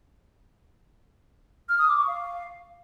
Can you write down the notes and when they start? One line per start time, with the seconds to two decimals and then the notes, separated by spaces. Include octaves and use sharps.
1.69 F6
1.78 D#6
1.88 D6
1.98 C#6
2.07 F5